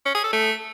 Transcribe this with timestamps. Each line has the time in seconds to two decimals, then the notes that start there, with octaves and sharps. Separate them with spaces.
0.06 C#4
0.15 G#4
0.24 A4
0.33 A3